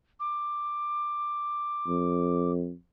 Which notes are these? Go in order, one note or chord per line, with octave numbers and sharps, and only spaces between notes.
D6
F2